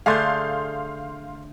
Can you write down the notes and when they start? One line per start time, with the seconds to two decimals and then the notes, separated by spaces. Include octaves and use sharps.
0.06 D3 A3 G#4 F5 C6 G6